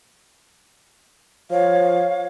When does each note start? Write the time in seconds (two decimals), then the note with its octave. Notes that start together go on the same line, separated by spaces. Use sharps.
1.51 F3 C#5 F5